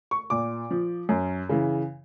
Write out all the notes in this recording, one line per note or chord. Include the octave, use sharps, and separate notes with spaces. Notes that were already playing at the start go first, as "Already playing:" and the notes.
C#6
A#2 D6
F3
F#2
C#3 E3